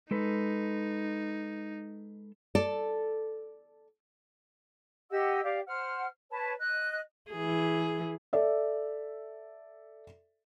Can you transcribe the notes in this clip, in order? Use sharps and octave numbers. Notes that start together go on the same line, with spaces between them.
G#3 D#4 A4 B4
A4 D5
G4 D#5 F#5 E6
G4 D5 F5
C5 F#5 F6
B4 C#5 A5
D#5 F#6
E3 G#4
A4 D5 E5